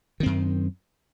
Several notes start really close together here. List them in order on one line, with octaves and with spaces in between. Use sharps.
D#3 C4 F#2